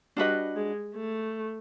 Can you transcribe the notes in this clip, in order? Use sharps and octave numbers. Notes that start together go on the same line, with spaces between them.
G3 D4 F#4 B4 D#5
G#3
A3